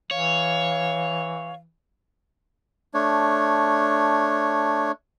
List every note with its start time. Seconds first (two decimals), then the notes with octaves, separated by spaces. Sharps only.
0.11 E3 C#5 F5
2.94 A3 D4 C#5